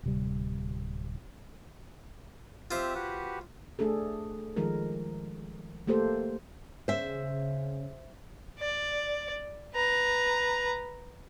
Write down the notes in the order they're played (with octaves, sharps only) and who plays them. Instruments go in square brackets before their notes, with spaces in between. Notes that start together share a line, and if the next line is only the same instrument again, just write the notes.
[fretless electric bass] D1 C3 G3
[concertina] C4 G4 E5 [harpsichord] F4 C5
[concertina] F#4 G4 B4
[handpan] A3 D4 G#4 A4
D#3 F3 G#3 D#4 A#4
A3 A#3 G4 A4 C5
[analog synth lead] C#3 [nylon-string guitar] C5 E5
[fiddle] D5
B4 A#5